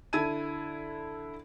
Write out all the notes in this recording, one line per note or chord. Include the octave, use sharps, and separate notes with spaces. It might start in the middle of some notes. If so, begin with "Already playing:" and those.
D3 E4 A5 G#6 D#7